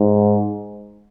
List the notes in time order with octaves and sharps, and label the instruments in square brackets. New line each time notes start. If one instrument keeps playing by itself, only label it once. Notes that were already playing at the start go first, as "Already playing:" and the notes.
Already playing: [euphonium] G#2